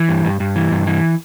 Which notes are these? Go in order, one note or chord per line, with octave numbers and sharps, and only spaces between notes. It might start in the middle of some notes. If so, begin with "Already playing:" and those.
Already playing: E3
G2
G2
G2
E3
G2
E3